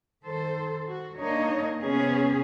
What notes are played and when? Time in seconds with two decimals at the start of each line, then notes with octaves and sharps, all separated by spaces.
0.23 D#3 A4 C5
0.89 F#4
1.18 A#3 D4 D#4 C#5 D#5
1.82 C3 B3 C#4 G#4